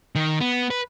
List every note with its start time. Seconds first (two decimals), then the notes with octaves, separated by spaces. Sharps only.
0.15 D#3
0.40 B3
0.70 B4